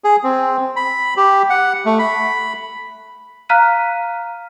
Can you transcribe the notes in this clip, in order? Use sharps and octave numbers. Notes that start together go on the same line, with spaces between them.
G#4
C4
B5
G4
F#5
A3
B5
F5 A#5 F6 F#6 B6 D#7